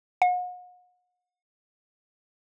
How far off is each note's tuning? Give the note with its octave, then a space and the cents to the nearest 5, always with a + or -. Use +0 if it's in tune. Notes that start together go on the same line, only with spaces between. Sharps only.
F#5 -40